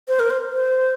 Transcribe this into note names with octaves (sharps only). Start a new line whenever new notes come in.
C5
A#4
C5
C5